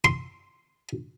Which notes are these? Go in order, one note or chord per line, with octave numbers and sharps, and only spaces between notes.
C6